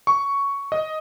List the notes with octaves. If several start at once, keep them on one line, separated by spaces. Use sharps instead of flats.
C#6
D#5